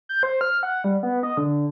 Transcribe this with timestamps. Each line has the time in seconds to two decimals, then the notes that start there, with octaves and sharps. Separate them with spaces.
0.09 G6
0.23 C5
0.41 F6
0.63 F#5
0.84 G3
1.03 B3
1.23 D#5
1.37 D3